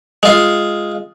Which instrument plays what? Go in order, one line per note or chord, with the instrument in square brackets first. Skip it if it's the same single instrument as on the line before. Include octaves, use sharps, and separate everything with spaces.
[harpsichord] G#3 F4